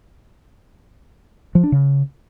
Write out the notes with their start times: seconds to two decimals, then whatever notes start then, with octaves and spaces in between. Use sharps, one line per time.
1.55 F3
1.64 D4
1.72 C#3